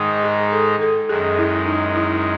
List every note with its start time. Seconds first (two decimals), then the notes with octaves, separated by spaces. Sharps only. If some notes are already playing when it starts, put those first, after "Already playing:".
Already playing: G#2 D#3 G#3 D#4
0.24 G#4
0.53 A4
0.81 A4
1.09 F#2 D#3 G#3 G#4
1.38 E4
1.66 D#4
1.95 E4